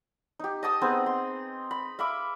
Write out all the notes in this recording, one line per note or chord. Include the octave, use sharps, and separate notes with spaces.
D#4 G4
D#5 A5 D#6 E6
B3 C4 D#4 G#4
C6
B5
E5 F5 B5 D6